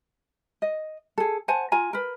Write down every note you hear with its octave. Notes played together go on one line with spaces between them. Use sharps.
D#5
G#4 A4
C5 F#5 G#5 A5
F4 G#5 A#5
A#4 B4